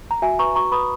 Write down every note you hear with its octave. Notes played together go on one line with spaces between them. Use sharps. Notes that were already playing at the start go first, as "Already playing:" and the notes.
A#5
F#4 E5 G#5
B4 A#5 C#6
F#4 A#5 C#6
B4 B5 D#6